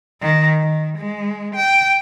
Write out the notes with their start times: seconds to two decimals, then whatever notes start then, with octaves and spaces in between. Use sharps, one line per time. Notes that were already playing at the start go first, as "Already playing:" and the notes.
0.21 D#3
0.60 D#3
0.98 G#3
1.55 G5